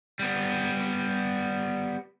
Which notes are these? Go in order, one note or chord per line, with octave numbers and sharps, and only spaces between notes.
G3 B3